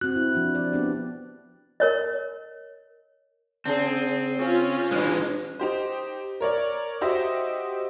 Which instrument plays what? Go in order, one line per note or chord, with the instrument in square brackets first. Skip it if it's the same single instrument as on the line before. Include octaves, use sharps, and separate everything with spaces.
[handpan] C4 F#4 [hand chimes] F#6
[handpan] E4
F3 D4 F#4
D5
B3 D4 G4
[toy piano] A#4 C#5 D#5
[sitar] C#3 G#4 [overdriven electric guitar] C4
[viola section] C#4 F4
[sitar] G2 [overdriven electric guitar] E3 G#3
[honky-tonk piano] D#4 G4 C5
A#4 C#5 D5
D#4 F#4 G4 C5 D#5 E5